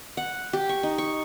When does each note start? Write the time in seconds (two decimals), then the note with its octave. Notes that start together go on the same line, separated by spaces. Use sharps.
0.17 F#5
0.53 G4
0.69 C#6
0.83 D#4
0.98 C#6